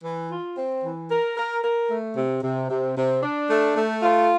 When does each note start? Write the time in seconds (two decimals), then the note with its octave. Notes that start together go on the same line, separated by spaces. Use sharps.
0.04 E3
0.30 F4
0.57 C4
0.83 E3
1.10 A#4
1.37 A#4
1.63 A#4
1.90 A3
2.16 C3
2.43 C3
2.70 C3
2.97 C3
3.23 D4
3.49 A3
3.76 A3
4.03 F4